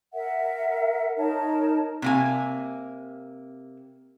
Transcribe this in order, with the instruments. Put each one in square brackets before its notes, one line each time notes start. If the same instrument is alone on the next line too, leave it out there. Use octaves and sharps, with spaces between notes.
[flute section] A#4 E5 F#5
D#4 A#4 C#5 A5
[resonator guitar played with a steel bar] C3 A#3 G#5